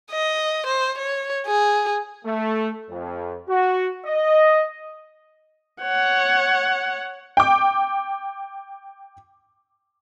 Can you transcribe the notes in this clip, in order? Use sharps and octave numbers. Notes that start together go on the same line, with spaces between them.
D#5
C5
C#5
G#4
A3
F2
F#4
D#5
C#5 F#5
G5 D6